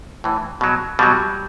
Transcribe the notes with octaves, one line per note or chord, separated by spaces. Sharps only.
A2 E3
B2 F#3
B2 F#3 G3